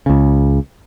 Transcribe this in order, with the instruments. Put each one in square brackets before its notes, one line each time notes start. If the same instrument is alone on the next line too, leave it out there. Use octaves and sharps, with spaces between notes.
[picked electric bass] C#2 C#3